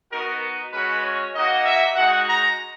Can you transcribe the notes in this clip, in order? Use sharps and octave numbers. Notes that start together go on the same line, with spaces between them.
B3 D#4 F#4 A#4
G#3 C#4 F#4 B4
C#5
A#3 D#4 F#4 D#5
E5
G#3 D#4 F#4 F#5
A#5